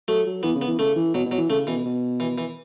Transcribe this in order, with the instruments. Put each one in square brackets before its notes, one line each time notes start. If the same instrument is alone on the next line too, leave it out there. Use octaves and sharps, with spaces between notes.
[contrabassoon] F#3 [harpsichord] A3
[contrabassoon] F#3
[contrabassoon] E3 [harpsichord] B3
[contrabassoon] C#3
[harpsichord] B3
[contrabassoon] E3
[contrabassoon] C#3 [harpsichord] A3
[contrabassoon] E3
[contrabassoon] B2 [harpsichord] F#3
[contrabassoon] B2
[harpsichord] F#3
[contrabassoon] E3
[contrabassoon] C#3 [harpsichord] A3
[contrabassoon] B2 [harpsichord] E3
[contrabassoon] B2
[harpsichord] E3
E3